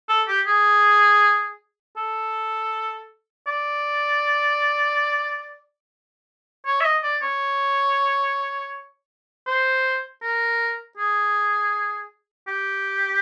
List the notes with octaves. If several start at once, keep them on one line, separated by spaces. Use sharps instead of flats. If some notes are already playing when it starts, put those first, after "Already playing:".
A4
G4
G#4
A4
D5
C#5
E5
D#5
D5
C#5
C5
A#4
G#4
G4